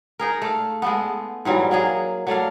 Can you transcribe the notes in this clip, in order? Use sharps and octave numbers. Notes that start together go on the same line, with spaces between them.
D#4 G#4 A#4
A3 F5
G#3 A3 B3
G#2 E3 F#3 G3
F#3 A#3 G#4
F#3 A3 D5 F5